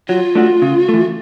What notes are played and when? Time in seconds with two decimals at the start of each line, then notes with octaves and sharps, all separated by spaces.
0.08 F#3 F4
0.35 A3 D4 F#4
0.62 C#3
0.89 E3 A3